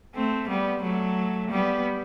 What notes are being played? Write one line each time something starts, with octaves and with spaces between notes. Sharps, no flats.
A3 C4
G3 B3
F#3 A3
G3 B3